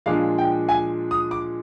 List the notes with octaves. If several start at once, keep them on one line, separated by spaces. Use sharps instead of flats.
A#2 F3 G#3 D4 F5
G5
G#5
D#6
D6